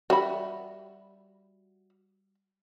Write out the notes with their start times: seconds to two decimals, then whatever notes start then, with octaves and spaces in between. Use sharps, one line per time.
0.10 G3 F#4 E5 B5